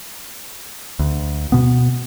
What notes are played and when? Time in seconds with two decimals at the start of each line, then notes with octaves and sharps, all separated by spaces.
0.99 D2
1.52 B2 B3